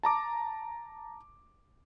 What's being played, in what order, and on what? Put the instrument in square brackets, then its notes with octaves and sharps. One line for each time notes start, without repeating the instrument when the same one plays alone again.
[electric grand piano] A5 A#5 D6